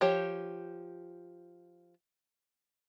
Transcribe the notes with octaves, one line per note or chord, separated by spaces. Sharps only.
F3 G4 C#5